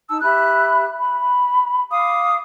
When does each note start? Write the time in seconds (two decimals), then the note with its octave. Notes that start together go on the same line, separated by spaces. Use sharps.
0.10 D#4 A5 E6
0.22 G4 E5 B5 F#6
0.99 B5
1.91 F5 D6 D#6